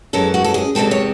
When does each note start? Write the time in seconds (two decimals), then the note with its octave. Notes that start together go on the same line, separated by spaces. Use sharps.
0.13 F#2 E3 G#3 C#4 A4
0.34 F#4
0.44 A4
0.54 G#4
0.75 E2 C3 E3 G#3 C4 A4
0.91 C#5